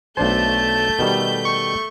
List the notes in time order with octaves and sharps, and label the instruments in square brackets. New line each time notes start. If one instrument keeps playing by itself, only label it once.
[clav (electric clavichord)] B1 D4 C5 [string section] A3 G6 [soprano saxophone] A5
[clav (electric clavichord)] B2 D#3 G3
[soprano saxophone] C#6